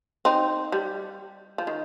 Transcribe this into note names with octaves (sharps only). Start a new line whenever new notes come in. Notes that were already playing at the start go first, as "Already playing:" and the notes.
C4 D#4
G3
F3
D#3